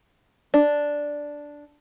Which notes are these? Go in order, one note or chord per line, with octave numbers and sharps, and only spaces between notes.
D4